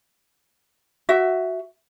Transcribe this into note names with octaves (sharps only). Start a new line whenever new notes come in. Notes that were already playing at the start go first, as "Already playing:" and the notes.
F#4 E5